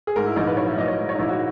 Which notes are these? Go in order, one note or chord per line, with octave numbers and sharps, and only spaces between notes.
G#4
G#2 A#4
E4
A#1 D#4
B4
F#3 C#5
E5
A#1 D#5
C#5
G#2
C#5
D#4
A#1 E4
F#4